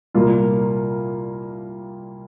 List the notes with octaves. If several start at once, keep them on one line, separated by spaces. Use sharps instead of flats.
C2 A#2 G3 A#3 F4